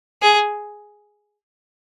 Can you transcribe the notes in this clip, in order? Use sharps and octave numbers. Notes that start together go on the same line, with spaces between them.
G#4